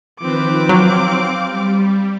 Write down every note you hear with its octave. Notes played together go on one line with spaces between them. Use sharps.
D#3 F3 C4 B4 D6
F#3 F5
G3